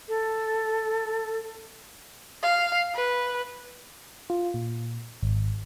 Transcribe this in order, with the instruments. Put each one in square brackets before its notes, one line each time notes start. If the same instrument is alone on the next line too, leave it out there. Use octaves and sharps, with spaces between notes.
[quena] A4
[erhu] F5
B4
[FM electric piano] F4
A#2
G#1